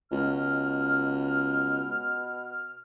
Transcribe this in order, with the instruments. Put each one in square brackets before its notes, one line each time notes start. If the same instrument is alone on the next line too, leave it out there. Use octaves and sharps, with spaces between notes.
[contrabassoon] C#2 [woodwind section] B2 F6